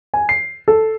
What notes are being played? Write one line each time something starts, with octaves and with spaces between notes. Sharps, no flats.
G#5
C7
A4